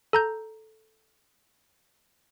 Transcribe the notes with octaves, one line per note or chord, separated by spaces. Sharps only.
A4 A#5 G6